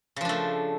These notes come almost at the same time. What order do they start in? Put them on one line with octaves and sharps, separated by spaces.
C#3 F3 D4 A3